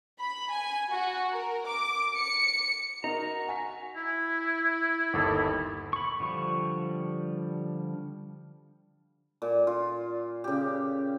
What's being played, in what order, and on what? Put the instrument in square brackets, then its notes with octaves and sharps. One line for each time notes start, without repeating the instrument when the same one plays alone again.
[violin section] B5
G#5
F#4
A#4
D6
C#7
[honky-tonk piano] D#4 A#4 [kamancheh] F#4 [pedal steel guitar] A#5
[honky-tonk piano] G#5 B6
[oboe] E4
[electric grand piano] G1 D#2 A4
[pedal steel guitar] B5 C#6
D3 F3 G3 C#6
[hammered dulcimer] A#2
F4
C#3 G4